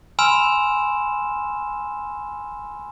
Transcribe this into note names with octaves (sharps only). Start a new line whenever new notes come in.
G#5 B5 C6 E6 F6 E7